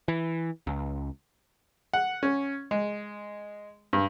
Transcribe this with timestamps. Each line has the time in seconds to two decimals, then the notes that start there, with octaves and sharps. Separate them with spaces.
0.08 E3
0.67 C#2
1.94 F#5
2.23 C#4
2.71 G#3
3.93 G2